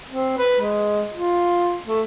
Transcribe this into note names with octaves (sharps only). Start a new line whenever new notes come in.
C4
B4
G#3
F4
A3